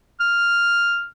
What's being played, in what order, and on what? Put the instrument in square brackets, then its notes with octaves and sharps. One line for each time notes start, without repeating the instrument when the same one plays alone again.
[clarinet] F6